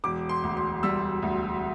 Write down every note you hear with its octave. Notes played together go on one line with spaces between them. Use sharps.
E1 D6
C6
D2
C6
G3 E6
D2